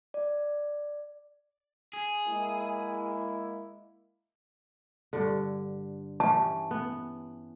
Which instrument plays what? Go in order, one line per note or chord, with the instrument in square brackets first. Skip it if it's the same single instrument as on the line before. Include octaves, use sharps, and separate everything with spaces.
[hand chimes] D5
[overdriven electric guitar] G#4
[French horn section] G#3 A#3 E4
[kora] G2 D3
[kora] E3 C#4 G4 [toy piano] A5
[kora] B3